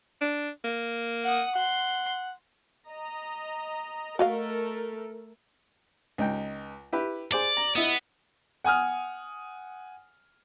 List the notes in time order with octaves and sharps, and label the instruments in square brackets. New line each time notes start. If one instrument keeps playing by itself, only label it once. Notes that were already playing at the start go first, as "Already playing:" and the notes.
[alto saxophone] D4
A#3
[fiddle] F#5 D#6
[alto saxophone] F#5 [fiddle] C6
[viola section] D#5 A#5
[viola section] A3 A4 A#4 [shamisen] F#4 D#5 F5
[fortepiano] C#2 D#4 G5
E4 G4 B4
[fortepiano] G#4 C5 D6 [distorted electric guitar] D5
[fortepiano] A#5
[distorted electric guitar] B3 [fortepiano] E4 D#5
[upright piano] F#5 G#5 D#6 F6